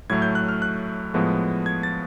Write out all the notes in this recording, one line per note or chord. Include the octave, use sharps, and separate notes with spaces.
A2 F#3 A3 G#6
G6
F#6
F6
F#6
A2 F3 G#3 B3
G#6
A6